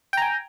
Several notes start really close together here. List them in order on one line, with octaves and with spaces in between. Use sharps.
G5 A#5 G#5